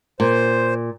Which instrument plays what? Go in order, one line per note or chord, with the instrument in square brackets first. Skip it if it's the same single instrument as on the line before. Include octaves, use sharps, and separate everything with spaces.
[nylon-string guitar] A#2 [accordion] C5